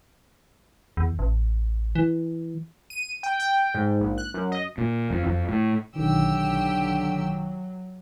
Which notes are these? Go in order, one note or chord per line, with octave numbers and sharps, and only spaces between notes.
E2
A1
E3
D#7
G5
G5
G#2
A#1
F#6
F#2
D#5
A#2
F2
F2
A2
B1 D3 D#3 F#3 G4 E6